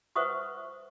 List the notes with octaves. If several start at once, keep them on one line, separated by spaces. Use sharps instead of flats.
B4 C5 E5 F#5 C#6 D#6